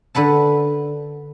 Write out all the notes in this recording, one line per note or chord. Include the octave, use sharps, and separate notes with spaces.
D3 B4 F#5 A5